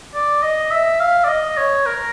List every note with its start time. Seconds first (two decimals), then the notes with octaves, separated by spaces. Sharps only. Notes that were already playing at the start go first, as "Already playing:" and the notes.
0.14 D5
0.43 D#5
0.71 E5
1.00 F5
1.24 D5
1.29 D#5
1.57 C#5
1.86 A#4